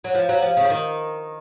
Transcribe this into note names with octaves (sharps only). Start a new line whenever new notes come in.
F#3
F3
F#3
F3
C#3
F3
D#3